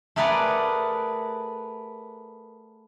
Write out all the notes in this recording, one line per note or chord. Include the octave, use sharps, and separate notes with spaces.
A3 G#4 A#4 B4 D5 F#5